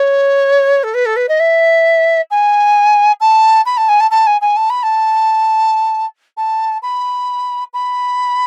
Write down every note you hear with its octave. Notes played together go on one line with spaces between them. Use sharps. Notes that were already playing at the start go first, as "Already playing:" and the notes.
Already playing: C#5
A4
B4
A4
B4
D#5
E5
G#5
A5
B5
A5
G#5
A5
A5
G#5
G#5
A5
B5
A5
A5
B5
B5